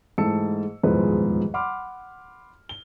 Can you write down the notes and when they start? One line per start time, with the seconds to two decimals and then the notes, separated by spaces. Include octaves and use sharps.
0.18 G#2 E3 A3 A5 E6 C#7
0.83 D#1 E2 G#2 F3 G#3 B4
1.54 F#5 B5 C6 D6 F6
2.69 G7